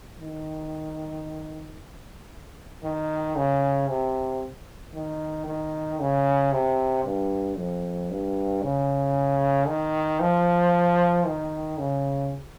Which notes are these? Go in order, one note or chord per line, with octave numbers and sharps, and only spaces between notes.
D#3
D#3
C#3
C3
D#3
D#3
C#3
C3
G2
F2
G2
C#3
D#3
F3
D#3
C#3